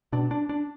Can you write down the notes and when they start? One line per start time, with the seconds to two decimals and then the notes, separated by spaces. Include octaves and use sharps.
0.12 B2 D4
0.31 D4
0.49 D4